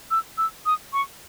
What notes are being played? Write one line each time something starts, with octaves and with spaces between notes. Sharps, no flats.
E6
E6
D#6
C#6